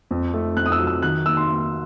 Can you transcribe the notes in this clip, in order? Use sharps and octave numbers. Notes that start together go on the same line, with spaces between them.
F2
A3
F2 F#6
D#6
E6
F#3
E6
D#3 F#6
A#3 E6
C6
A#3